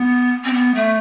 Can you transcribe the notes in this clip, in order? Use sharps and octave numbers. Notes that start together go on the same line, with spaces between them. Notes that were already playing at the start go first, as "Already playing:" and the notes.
Already playing: B3
C4
B3
A3